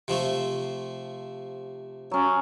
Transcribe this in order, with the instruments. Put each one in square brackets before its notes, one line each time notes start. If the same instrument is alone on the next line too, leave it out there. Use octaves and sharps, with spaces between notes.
[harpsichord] C3 F3 A3
[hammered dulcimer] F#3 C#4